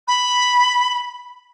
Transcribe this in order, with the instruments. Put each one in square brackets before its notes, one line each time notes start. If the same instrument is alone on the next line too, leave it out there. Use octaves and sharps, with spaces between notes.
[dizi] B5